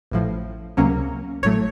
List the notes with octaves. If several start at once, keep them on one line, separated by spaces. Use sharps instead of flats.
A1 A2 F3
C#2 C3 F#3 A#3 C#4
A1 A2 F#3 A3 C#5